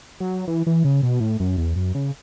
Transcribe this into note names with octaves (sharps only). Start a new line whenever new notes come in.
F#3
E3
E3
C#3
B2
A2
F#2
E2
F#2
C#3